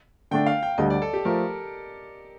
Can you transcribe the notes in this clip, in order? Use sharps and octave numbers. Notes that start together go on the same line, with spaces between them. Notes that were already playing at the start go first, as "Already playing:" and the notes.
D3 A3 D4 G5
F5
G5
D2 D3 G3 D#5
D5
A4
G4
F3 A3 A#4